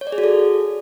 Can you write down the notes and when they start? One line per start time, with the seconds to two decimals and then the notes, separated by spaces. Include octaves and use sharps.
0.01 C#5
0.07 D5
0.12 G#4
0.18 F#4
0.24 A4